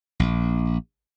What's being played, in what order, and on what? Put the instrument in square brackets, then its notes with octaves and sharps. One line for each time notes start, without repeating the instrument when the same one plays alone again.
[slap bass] A#1